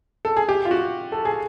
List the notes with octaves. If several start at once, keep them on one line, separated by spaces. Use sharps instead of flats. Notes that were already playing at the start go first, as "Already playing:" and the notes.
A4
G#4
G4
F4
F#4
A4
G#4